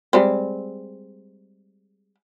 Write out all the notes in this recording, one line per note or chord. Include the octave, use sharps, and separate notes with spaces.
G3 G#3 C4